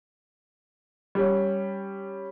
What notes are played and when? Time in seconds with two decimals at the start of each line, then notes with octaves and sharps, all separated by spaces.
1.15 G3 C#4